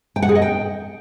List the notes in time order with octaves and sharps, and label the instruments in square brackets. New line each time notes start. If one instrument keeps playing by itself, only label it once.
[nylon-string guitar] G5
F#5
G#4
D#5
G5